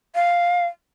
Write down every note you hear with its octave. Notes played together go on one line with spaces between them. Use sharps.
F5